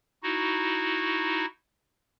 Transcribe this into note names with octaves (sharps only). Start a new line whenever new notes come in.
D#4 E4 F#4